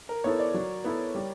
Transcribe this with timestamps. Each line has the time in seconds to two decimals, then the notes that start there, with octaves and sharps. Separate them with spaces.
0.09 A#4
0.24 B3 E4 A4 C#5
0.39 D5
0.54 F#3
0.84 B3 E4 A4
1.15 G3